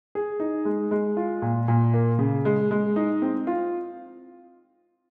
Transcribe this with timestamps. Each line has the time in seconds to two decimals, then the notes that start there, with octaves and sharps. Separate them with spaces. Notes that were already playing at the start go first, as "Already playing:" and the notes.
0.15 G#4
0.40 D#4
0.65 G#3
0.91 G#3
1.17 F4
1.42 A#2
1.68 A#2
1.94 A#3
2.19 C#3
2.45 G#3
2.71 G#3
2.96 D#4
3.22 C4
3.47 F4